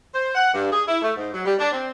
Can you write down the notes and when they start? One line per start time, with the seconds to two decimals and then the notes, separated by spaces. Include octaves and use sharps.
0.12 C5
0.35 F#5
0.52 G2
0.71 G#4
0.86 E4
1.01 A3
1.15 G#2
1.32 F#3
1.44 G3
1.58 D4
1.71 C4